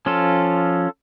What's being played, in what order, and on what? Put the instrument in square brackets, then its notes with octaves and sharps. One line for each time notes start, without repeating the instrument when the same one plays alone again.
[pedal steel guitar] F3 C#4 F4 A4